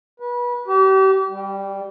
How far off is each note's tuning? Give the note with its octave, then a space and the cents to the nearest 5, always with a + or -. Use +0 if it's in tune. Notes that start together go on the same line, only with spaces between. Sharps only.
B4 -25
G4 -35
G3 +5